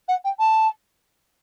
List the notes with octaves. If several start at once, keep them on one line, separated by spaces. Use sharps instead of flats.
F#5
G5
A5